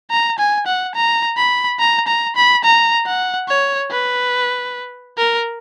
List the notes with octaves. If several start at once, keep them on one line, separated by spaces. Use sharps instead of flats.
A#5
G#5
F#5
A#5
B5
A#5
A#5
B5
A#5
F#5
C#5
B4
A#4